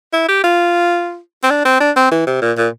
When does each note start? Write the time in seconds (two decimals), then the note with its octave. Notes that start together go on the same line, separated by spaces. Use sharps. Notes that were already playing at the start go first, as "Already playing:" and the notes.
0.13 E4
0.28 G4
0.44 F4
1.43 C4
1.50 D4
1.65 C4
1.80 D4
1.96 C4
2.11 E3
2.27 C3
2.41 A#2
2.57 A#2